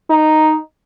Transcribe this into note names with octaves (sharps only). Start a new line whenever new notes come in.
D#4